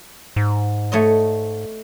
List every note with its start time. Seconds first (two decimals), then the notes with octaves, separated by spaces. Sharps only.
0.36 G#2
0.92 A3 C#5 D#5